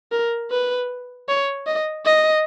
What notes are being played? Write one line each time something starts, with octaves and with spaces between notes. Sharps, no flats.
A#4
B4
C#5
D#5
D#5